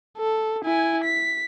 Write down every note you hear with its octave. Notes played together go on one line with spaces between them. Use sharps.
A4
E4 G#5
B6